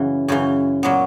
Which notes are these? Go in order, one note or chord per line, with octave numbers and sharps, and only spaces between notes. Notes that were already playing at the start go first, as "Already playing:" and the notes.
Already playing: F#2 C#3 E3
F#2 C#3 E3
A#2 F#3 B3